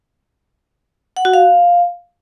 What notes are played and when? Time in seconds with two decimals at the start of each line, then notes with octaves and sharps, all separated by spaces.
1.17 F#5
1.25 F#4
1.34 F5